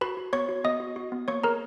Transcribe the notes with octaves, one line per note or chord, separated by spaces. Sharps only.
F#4 B4 B5
F#4
B3 C#5 C#6
F#4
B3 D#5 D#6
F#4
F#4
B3
A#3 C#5 C#6
G#4 A#4 A#5